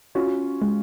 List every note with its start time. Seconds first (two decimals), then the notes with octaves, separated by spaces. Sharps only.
0.15 C#4 F4 F#4
0.62 G#3